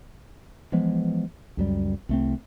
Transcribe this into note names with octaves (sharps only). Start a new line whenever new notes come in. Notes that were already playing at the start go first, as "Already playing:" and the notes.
E3 F3 G#3 B3
C#2 F#2 G3
C2 A3 C4